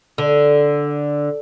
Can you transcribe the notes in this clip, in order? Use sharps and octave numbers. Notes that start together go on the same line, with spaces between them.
D3